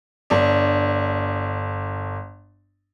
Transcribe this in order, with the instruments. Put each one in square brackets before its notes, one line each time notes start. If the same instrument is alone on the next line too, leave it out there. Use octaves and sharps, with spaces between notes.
[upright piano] G1 D4